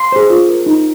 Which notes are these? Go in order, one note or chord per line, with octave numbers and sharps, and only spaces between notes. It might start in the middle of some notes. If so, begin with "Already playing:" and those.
Already playing: C6
G#4 C5
F4
A#4
D#4